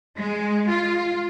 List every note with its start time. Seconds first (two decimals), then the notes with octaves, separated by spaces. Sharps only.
0.17 G#3
0.69 F4